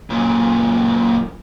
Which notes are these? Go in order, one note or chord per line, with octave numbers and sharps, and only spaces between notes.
F#2 A#2